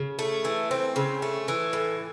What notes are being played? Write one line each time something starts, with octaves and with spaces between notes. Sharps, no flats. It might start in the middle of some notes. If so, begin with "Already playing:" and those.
Already playing: C#3
A3
E3
C4
C#3
A3
E3
A2